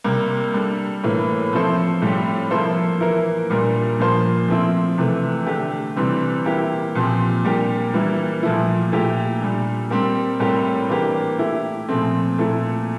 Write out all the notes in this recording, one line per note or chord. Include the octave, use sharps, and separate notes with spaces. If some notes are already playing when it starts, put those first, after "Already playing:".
C3 G3 A#3
G3 D4 A4
A2 E3 A#3
F3 C4 E4 A4 C5
A2 G3 C4 G4
F3 A#3 E4 A4 C5
E3 A#3 E4 A#4
A#2 G3 D4 F4 A#4
A#2 F3 A#3 F4 C5
F3 A3 C4 E4
C3 E3 A3
D3 A3 D4 G4
C3 E3 G3 C4
E3 A#3 E4 G4
A#2 F3 C4 G4
A#2 G3 D4 G4 A#4
E3 G3 A#3 E4
A#2 F3 A3 E4
A#2 A3 E4 G4
A#2 G3 D4
G3 C4 G4 A#4
A2 G3 C4 G4 A#4
E3 A#3 D4 G4 A#4
A3 E4 G4
A#2 F3 A3 C4
A#2 A3 E4 A4